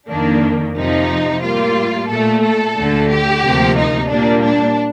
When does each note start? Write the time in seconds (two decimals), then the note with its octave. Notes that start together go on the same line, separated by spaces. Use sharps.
0.09 F2 D#3 A#3 D4
0.75 F2 C3 F3 D#4
1.42 A2 G3 A#3 F4
2.09 A#2 A3 A4
2.43 A4
2.76 D2 D3 A3
3.10 G4
3.43 D2 C3 F3 A#3
3.77 D#4
4.10 A#2 G3 A#3 D4
4.43 D4